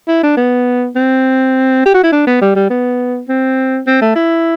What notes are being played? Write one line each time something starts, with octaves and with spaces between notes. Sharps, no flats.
E4
D4
B3
C4
G4
F#4
E4
D4
B3
G3
G3
B3
C4
C4
A3
E4